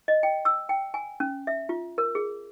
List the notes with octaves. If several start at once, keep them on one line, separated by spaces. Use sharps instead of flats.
D#5
G5
E6
G5
G#5
C#4
E5
F4
A#4
G#4